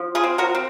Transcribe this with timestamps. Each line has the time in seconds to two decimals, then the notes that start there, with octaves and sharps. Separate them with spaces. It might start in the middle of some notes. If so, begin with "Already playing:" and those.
Already playing: F3
0.15 F4 G#4
0.24 C4
0.38 F#4 A#4
0.55 C4